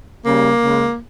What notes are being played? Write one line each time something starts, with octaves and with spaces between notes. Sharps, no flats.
C#3 G3 A#3
C#3 G#3